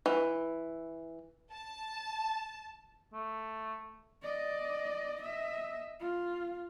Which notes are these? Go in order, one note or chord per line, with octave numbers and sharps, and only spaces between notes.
E3
A5
A3
D5 D#5
D#5 E5
F4